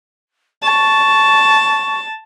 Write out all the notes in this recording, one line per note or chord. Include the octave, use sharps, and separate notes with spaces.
A5 C#6